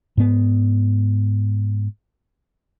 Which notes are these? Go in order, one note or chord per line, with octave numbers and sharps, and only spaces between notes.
G#2 B3